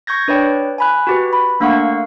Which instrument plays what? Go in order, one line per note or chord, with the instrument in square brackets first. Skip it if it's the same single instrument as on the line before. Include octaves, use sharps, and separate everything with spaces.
[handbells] C#6 G6 G#6 A#6
D4 B4 C#5 D5 G5
G#5 B5 F#6
F#4 G4 B4
B5
A3 A#3 D4 F5 F#5 C#6